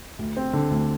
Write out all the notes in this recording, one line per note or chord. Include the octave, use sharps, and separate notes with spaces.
D2
C4
D3
D2